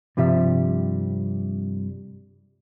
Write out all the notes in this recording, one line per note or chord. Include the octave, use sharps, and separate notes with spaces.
G2 C3 F3 G3 E5